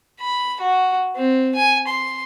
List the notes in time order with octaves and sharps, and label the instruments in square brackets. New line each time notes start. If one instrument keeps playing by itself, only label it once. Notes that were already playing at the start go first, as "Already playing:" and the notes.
[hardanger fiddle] B5
F#4
C4
G#5
C6